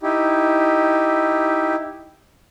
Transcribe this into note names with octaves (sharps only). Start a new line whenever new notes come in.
D#4 E4 G4